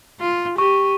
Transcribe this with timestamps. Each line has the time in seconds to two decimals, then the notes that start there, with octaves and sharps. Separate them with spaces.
0.20 F4
0.58 G4 C#6